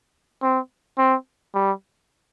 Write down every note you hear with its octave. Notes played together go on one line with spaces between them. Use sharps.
C4
C4
G3